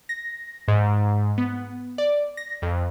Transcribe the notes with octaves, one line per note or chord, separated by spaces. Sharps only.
A#6
G#2
B3
D5
A#6
F2